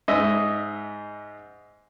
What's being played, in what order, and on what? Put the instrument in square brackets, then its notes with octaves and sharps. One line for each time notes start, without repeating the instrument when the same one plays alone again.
[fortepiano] G#2 D#5 E5 D#6